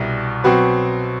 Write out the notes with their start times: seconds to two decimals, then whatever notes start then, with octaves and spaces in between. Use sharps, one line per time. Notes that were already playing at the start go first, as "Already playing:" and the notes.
Already playing: C2 B2 G3
0.44 B2 F#3 C4 F#4 B4